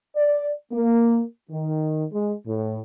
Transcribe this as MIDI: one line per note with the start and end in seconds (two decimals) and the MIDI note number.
0.16 0.51 74
0.72 1.22 58
1.51 2.05 51
2.11 2.33 56
2.46 2.79 45